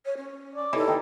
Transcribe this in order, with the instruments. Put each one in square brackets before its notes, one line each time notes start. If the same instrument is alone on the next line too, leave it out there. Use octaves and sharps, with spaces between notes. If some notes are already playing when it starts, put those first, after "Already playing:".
[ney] C#5
C#4
[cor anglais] D5
[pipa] E3 [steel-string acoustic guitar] D#4 G4 C#5 [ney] A4
[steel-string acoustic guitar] D#2 D3 G5 [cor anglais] D#4